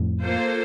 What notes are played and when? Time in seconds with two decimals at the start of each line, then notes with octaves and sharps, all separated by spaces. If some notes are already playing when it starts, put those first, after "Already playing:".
Already playing: F2 A2
0.23 A#3 F4 A4 C5